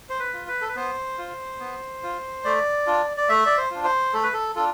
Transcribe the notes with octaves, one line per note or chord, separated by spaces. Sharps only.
C5
B4
F4
B4
A4
B4
B3 C5
F4
B3
F4
A3 D5
D4 F4
D5
A3 E5
D5
C5
D4 F4
C5
A3 A4
B4
A4
D4 F4 A4